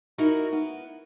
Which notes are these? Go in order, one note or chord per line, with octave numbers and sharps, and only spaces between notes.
D#4 E4 F#4 A#4
B3